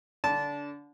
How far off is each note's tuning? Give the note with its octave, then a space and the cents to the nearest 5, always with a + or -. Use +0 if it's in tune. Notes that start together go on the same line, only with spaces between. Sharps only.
D3 -25 D4 -20 A5 -15